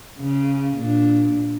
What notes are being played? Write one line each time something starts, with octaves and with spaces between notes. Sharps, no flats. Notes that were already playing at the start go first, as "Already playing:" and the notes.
C#3
A#2 D4